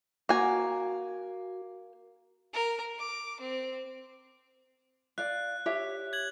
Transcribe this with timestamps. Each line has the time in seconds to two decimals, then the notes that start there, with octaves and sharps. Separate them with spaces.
0.29 A#3 F#4 G#5
2.53 A#4
2.98 D6
3.41 C4
5.18 D5 F5 F#6
5.66 G4 C#5 E5
6.13 G#6 F#7